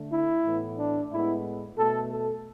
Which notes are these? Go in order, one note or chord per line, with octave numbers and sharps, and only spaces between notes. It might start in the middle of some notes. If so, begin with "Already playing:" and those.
Already playing: D3 A3
E4
A2 E3 B3
D4
A2 G#3 B3 E4
B2 A3 A4
A4